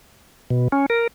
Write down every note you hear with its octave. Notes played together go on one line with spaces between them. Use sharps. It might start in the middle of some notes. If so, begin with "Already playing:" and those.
B2
C#4
A#4